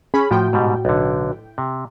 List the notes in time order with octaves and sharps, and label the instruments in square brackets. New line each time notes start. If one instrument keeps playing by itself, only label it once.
[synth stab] C#4 B5 [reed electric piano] G#4
[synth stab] A2 G5 [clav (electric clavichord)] F3 [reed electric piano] F#4
[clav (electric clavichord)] G#2 B2 G3
B1 D3
C3